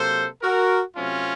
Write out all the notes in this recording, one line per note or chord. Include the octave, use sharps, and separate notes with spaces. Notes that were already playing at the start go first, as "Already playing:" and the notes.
Already playing: C3 F#3 A#3 A4 C5
F#4 A#4
C3 F#3 A3 C4 C#4 F4